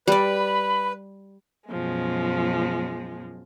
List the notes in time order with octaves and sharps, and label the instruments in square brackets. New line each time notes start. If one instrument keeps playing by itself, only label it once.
[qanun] G3 D5 [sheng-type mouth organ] B4 [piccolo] B5
[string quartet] F#2 B2 F3 G#3